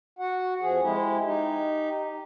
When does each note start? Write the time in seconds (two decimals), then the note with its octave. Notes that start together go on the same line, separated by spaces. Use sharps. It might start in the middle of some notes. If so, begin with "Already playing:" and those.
0.19 F#4 F#5
0.61 F2 F3 G#4
0.82 G#3 E4 G4
1.24 D#4 G4